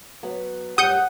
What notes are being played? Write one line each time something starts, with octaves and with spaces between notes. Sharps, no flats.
F#3 B3
F#2 G3 G4 F#5 D#6 G6 C#7